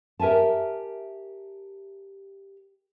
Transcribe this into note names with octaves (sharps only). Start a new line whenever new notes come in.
G4 A#4 E5 G#5 A5